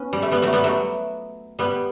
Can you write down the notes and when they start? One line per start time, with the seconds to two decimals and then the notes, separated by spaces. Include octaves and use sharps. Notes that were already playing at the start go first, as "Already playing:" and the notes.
Already playing: B3 C#4
0.13 G3
0.22 A3
0.31 G3 B3
0.42 F#3 A3
0.53 G3 B3
0.64 F#3 A3
1.59 G3 B3